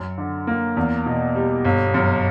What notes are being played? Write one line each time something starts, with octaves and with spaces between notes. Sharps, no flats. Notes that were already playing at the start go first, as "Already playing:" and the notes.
Already playing: F#2
D3
A#3
E2
B2
G3
G1
F#2